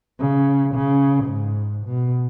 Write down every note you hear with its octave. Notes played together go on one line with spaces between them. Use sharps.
C#3
C#3
G#2
B2